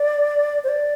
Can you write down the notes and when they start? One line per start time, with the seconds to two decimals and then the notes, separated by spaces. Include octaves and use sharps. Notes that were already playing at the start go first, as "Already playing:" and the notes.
Already playing: D5
0.64 C5
0.68 D5